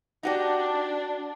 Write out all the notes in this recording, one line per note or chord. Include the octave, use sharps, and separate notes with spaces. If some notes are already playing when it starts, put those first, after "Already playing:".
D4 D#4 F#4 G4